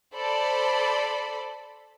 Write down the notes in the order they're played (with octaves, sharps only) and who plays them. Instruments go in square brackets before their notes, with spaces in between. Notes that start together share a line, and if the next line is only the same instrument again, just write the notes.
[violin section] A4 C5 D5 B5